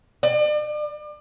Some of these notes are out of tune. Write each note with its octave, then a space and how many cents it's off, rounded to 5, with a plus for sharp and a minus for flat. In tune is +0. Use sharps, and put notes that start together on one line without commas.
D5 +40